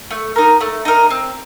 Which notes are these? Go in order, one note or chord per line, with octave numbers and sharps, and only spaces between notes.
A3
D#4 A#4
A3
D#4 A#4
C4